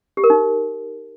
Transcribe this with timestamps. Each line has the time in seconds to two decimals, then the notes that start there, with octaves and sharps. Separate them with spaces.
0.17 G4
0.24 A#4
0.30 D#4